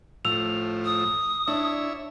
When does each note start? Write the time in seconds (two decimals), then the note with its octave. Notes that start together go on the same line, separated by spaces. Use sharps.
0.25 A2 F3 E6 F7
0.85 D#6
1.48 D4 E4 C#5 E5